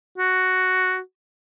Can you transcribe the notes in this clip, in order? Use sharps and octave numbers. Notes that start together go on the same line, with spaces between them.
F#4